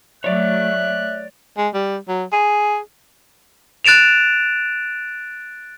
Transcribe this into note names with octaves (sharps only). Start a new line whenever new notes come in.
F#3 A3 C#5 D5 E5 F#6
G#3
G3
F#3
G#4
F#6 A6 D7 E7 F7